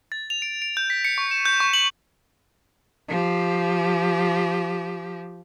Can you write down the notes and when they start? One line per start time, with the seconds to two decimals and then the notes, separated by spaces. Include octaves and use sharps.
0.12 A6
0.30 F7
0.42 D7
0.62 D7
0.77 G6
0.90 B6
1.05 C#7
1.18 C#6
1.31 E7
1.45 G6
1.60 C#6
1.73 F#7
3.09 F3 G4